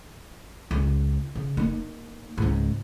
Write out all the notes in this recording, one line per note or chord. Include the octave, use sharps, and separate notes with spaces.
C#2
C#3
A#3 D#4
C#2 G#2